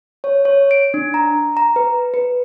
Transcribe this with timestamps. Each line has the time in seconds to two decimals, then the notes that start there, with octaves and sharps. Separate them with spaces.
0.24 C#5
0.45 C#5
0.71 D7
0.94 D4
1.14 A#5
1.57 A#5
1.76 B4
2.14 B4